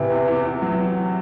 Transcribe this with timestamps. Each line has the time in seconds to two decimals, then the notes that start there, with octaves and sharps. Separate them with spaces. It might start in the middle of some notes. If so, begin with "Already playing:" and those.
Already playing: C3 E3
0.11 E2
0.28 E2
0.45 E2
0.62 F#3